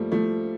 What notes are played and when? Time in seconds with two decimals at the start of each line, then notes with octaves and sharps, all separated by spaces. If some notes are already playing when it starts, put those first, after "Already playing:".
Already playing: F3 G3 A3 A#3
0.12 F3 A3